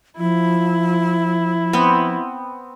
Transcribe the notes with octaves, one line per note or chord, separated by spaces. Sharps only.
F3 E4
B3 C4